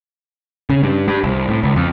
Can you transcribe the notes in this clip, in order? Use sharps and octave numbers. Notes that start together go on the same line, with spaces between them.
C#3
G2
G2
C2
A2
C#2
F2